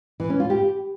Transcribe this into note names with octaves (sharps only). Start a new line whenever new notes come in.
E3
C#4
F4
G4